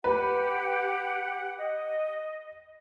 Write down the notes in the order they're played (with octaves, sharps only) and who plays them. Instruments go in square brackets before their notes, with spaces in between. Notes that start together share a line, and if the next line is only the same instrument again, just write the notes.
[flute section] G4 F#5 [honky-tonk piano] B4
[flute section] D#5